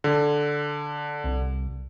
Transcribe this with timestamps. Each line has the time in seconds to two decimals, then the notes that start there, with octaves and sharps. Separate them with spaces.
0.04 D3
1.24 C2